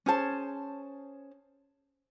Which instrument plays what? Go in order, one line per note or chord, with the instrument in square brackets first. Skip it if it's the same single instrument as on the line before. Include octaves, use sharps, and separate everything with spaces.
[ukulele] C#4 G#4 C5 A5